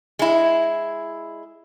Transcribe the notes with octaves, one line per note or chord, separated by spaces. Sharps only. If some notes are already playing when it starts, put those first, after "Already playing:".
G#3 E4